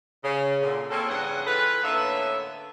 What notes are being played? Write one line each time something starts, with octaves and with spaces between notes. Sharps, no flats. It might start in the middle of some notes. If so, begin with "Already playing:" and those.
C#3
A#2 D3
A#3 C4 C#4 G#4 A4
E2 G2 C#3 G#4 F#5
E3 F4 A4 B4
A2 D3 A#3 B3 C#4 E5